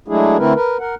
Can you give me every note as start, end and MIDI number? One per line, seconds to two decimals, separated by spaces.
0.08 0.37 54
0.08 0.37 56
0.08 0.37 57
0.08 0.37 62
0.08 0.37 64
0.08 0.37 68
0.38 0.53 50
0.38 0.53 57
0.38 0.53 60
0.38 0.53 64
0.38 0.53 70
0.38 0.53 71
0.55 0.77 70
0.55 0.77 71
0.80 0.95 70
0.80 0.95 78